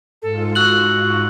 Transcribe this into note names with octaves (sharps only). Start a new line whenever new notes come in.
G#2 F4 A4
F#4 E6 F#6 F#7